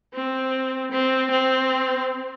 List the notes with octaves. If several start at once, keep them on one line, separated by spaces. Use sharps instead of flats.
C4
C4
C4